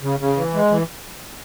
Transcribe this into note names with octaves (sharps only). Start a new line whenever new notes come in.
C#3
C#3
E3
G#3
E3